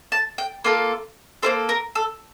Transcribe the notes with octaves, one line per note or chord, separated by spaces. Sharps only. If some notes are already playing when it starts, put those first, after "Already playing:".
A5
G5
A#3 F4 A4
A#3 E4 A4 C5
A#4
A4